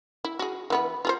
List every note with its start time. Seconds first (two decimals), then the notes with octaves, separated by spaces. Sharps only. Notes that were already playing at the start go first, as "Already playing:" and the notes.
0.24 E4
0.39 F#4 G#4
0.70 E3 B3 B4
1.05 F4 G#4 C5